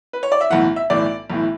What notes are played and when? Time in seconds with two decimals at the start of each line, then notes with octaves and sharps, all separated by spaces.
0.13 B4
0.23 C#5
0.32 D5
0.41 E5
0.50 B1 A2 E3 F#5
0.76 E5
0.90 B1 A2 E3 D5
1.30 B1 A2 E3